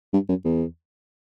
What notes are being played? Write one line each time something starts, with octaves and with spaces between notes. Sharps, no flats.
G2
F#2
E2